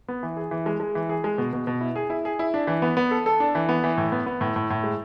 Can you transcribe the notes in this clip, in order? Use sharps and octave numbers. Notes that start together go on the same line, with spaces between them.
B3
E3
G#4
E3
G#3
G#3
E3
G#4
G#3
B2
B2
B2
E4
G#4
E4
G#4
E4
D4
E3
B3
B3
A4
A4
D4
E3
B3
E3
A2
B3
B3
A2
A2
A2
G#3